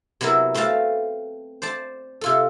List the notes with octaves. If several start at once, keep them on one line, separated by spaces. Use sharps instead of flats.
C3 F#3 B3 E4 A#4
A3 C4 B4 F5 A5
C5 D5 A5
C3 F4 A4